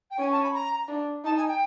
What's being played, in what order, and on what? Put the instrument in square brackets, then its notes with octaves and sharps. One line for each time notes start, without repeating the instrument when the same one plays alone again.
[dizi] G5
[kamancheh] C#4 [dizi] G#5
[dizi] A5
B5
A#5
[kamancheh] D4
[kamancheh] D#4 [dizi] A5
[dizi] G#5
G5